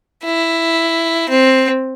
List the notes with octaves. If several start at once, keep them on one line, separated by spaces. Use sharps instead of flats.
E4
C4